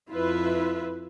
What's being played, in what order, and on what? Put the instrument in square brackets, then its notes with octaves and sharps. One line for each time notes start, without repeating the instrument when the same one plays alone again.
[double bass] F2 E4 [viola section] F4 B4 E5